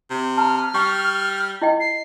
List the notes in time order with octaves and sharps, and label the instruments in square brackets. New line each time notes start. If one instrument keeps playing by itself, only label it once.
[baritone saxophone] C3
[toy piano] A5 A#5 [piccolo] F6
[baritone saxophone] G3 [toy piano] G5 C#6
[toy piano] E4 D#5 G5
[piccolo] C7